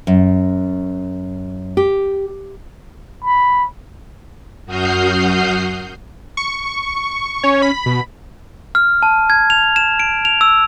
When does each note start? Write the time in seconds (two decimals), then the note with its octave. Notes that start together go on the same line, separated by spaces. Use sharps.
0.07 F#2
1.77 G4
3.24 B5
4.66 F#2 F#4 D#6 F6 G6 C7
6.37 C#6
7.44 C#4 C#5
7.62 B5
7.86 B2
8.75 F6
9.02 A5
9.30 G#6
9.50 F7
9.76 E7
10.00 D7
10.25 F7
10.41 E6